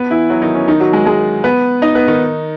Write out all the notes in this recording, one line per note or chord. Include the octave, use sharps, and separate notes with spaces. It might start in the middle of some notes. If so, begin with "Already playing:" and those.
Already playing: B3 B4
E3 E4
F#3 F#4
D#3 D#4
C#4
D#3 D#4
F#3 F#4
G#3 G#4
G#3 G#4
B3 B4
D#4 D#5
B3 B4
D#3 D#4